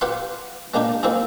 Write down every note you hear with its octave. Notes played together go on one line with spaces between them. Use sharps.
G4 B4 F5 F#5 C6
G#3 A#3 D4 D#4 G4
A#3 C4 D#4 E4 G#4